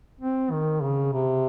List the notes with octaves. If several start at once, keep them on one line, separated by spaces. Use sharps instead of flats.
C4
D#3
C#3
C3